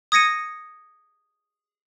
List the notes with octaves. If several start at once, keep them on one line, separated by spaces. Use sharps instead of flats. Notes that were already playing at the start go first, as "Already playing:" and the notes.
D#6 G#6 A#6 C#7 D#7